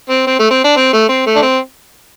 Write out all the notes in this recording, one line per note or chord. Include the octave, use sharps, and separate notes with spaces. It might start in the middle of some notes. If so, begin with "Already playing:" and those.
C4
C4
A3
C4
D4
C4
A3
C4
A3
D4
C4